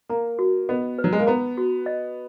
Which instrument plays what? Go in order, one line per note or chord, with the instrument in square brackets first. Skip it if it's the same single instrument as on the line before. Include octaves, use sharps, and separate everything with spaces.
[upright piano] A#3 [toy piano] A#5
[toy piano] F#4
[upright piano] B3 [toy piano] D#5
[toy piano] B4
[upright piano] F#3
G#3
A#3
[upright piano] B3 [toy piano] A#5
[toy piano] F#4
D#5